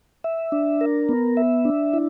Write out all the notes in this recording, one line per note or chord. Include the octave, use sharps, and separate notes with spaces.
E5
D4
A#4
B3
E5
D4
E4